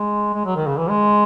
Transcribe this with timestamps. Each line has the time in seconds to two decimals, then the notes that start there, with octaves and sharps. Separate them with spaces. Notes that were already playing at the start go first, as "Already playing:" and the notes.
Already playing: G#3
0.34 G#3
0.45 F#3
0.56 D#3
0.67 C#3
0.78 E3
0.89 G#3